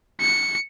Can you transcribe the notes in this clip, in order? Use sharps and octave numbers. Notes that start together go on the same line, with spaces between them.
C#7